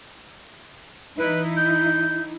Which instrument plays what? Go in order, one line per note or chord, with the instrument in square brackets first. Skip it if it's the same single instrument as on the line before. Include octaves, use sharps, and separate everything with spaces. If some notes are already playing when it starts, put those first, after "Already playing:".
[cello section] E3 D#4 E4 [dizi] B4
[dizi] G6